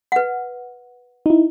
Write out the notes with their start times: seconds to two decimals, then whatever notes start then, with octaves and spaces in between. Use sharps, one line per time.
0.12 B4 F#5
1.26 D#4 E4